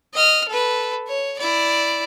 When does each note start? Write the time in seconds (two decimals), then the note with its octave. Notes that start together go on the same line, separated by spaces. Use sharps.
0.14 D#5 F6
0.49 A4 B4
1.07 C#5
1.39 E4 D5